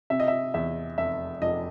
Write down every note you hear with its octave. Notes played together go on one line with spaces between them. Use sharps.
C3 E5
D#5
E5
E2 E5
F1 E5
F1 D#5